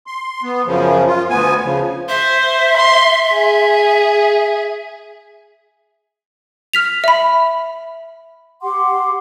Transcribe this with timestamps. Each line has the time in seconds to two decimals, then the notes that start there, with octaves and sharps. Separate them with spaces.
0.07 C6
0.43 B3
0.66 F#2 C#3 F3
1.07 F4
1.30 D2 B3 G#5
1.64 C#3 F3
2.09 C5 E5
2.77 C6
3.33 G#4
6.74 F6 B6 F7
7.04 E5 B5
8.62 G4 F#5 C6 D6